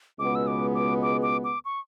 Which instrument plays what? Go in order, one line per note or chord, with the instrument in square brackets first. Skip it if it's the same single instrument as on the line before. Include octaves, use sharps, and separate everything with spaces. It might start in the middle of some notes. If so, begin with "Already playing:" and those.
[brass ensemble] C#2 B2 G#3 B3 [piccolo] D6
[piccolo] E6
D6
D6
D6
D6
D6
C#6